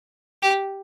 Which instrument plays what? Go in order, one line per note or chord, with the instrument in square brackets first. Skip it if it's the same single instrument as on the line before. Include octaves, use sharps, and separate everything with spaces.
[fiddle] G4